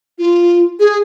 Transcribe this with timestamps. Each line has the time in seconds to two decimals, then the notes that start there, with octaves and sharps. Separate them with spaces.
0.19 F4
0.80 G#4